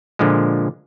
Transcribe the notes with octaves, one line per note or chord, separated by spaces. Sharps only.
A#2 D3 F3 G#3